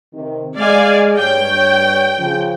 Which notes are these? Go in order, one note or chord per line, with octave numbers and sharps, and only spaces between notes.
C3 D#3
G#3 D5 F5 G#5
G2 C#5 G5
C#3 F3